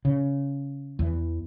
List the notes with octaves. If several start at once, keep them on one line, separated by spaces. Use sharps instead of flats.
C#3
E2 E3